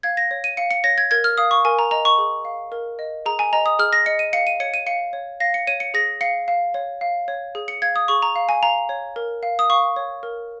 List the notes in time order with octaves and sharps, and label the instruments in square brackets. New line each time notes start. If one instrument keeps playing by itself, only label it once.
[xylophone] F5 G#6
A#6
C#5
D#7
F5 C#7
C#7
C#5 A#6
G#6
A#4 G#6
F6
F5 D#6
C#6
A#4 G#5
A#5
D#5 A#5
C#6
G#4
F5
A#4
D#5
G#4 A#5
G#5
D#5 A#5
D#6
G#4 F6
A#6
D#5 C#7
D#7
F5 C#7
D#7
C#5 C#7
D#7
F5 C#7
C#5
F5 A#6
C#7
C#5 D#7
C#7
G#4 A#6
F5 C#7
F5
C#5
F5
C#5
G#4
C#7
F5 G#6
D#6
G#4 C#6
A#5
F5
G#5
F5 A#5
C#5
A#4
F5
D#6
F5 C#6
C#5
A#4